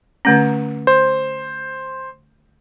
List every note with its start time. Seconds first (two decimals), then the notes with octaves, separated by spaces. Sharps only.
0.25 D3 A3 C#4
0.87 C5